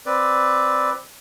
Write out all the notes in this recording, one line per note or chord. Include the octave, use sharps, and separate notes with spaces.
C4 B4 D5